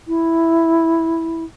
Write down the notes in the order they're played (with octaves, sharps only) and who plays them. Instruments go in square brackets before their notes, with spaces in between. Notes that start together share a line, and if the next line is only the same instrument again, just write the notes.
[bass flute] E4